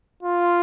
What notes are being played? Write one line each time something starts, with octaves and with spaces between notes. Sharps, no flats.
F4